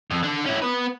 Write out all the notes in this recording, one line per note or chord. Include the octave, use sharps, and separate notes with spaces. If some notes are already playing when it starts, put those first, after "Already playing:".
F2
D3 D4
C#4 E4
B3 B4